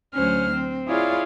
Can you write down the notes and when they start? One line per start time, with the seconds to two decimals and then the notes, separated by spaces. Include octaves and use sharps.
0.14 D2 F#3 C#4 C5 F6
0.54 C4
0.87 E4 F4 G#4 C#5 D5 F5